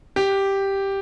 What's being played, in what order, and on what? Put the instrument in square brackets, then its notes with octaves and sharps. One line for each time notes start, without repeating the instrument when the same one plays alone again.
[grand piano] G4